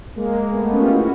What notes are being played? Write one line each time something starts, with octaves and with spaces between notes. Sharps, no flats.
G#3 A#3
A3 B3
B3 C#4
F4 G4
E4 F#4